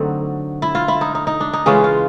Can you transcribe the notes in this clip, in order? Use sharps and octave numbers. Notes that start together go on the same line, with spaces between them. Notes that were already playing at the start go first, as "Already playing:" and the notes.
Already playing: D3 F#3 A3 C4 D#4
E4
F4
E4
D#4
D#4
D#4
D4
D#4
C#3 E3 G#3 C#4 F4
F4